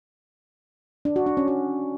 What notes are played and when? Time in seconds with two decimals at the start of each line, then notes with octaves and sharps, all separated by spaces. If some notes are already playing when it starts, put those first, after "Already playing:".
1.05 D4
1.16 F#4
1.26 D4
1.37 C#4
1.48 F#4